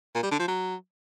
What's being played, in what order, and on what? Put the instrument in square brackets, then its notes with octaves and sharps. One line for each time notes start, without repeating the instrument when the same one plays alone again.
[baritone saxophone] A#2
G3
D3
F3
F#3